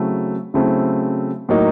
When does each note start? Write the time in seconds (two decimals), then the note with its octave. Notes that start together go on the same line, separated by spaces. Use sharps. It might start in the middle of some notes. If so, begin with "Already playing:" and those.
Already playing: C#3 F#3 A3 C4 E4
0.54 C#3 F#3 A3 C4 E4
1.49 A2 F#3 A#3 D#4